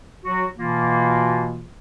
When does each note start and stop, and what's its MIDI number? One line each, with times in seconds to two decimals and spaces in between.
0.25 0.45 54
0.25 0.45 66
0.58 1.66 47
0.58 1.66 52
0.58 1.66 58
0.58 1.66 65